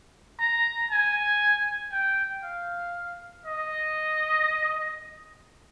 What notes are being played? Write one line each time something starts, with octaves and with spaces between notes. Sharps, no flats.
A#5
G#5
G5
F5
D#5